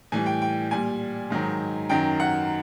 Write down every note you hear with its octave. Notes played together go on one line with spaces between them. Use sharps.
A2 E3 G3 G#5
G5
G5
A#2 G3 G#5
G#2 D#3 F#3
F#2 D#3 F#3 G5
F#5